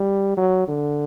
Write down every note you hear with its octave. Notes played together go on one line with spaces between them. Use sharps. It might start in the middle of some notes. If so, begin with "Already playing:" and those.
Already playing: G3
F#3
D3